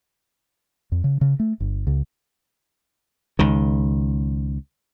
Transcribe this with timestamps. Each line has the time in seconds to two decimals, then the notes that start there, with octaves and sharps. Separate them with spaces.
0.92 F2
1.04 C#3
1.21 C#3
1.39 A3
1.60 G1
1.87 C#2
3.39 C#2 D#3